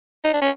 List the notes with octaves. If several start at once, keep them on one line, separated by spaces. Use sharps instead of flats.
D#4
D4
C#4